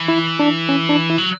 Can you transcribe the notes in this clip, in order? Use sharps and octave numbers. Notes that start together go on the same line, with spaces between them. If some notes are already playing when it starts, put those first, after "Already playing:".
Already playing: E3
E4
D4
C#4
D4
E4
F#3